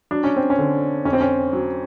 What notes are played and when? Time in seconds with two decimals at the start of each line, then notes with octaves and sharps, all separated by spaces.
0.11 F#3 D4
0.24 C#4
0.36 C4
0.50 C#4
0.58 D3
1.05 F2 C#4
1.13 C4
1.21 C#4
1.53 F#3